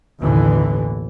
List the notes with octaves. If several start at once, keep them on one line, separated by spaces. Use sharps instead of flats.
A1 D#2 B2 D3 E3